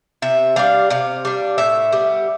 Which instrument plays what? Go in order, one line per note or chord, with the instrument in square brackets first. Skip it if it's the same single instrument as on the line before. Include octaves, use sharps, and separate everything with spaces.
[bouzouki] C3 E5
G3 D4 F5
C3 F5
G3 D4
A2 E5
G3 B3